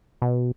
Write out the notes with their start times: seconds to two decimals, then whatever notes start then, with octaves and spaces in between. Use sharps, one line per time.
0.22 B2